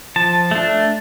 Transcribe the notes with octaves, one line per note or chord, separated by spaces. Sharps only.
F3 A5
A3 D4